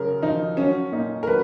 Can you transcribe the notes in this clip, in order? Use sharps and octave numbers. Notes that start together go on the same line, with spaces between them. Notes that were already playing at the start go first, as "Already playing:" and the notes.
Already playing: F#2 C#3 A#4
F3 D#4
F#3 C#4
A#2 D#4
A#4
F#3 B4